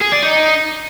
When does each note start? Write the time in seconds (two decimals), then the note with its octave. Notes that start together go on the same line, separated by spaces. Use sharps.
0.01 G#4
0.12 D5
0.23 D#4